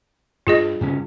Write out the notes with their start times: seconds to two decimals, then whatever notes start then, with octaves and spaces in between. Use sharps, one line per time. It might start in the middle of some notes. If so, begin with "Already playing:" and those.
0.47 G2 F4 G#4 D#5
0.81 G2 C#3 C#4